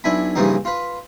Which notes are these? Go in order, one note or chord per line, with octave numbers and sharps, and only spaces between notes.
B1 D4 E4 G#5 B5
G2 C#3 E3 F3 A#3 D#4
F4 B4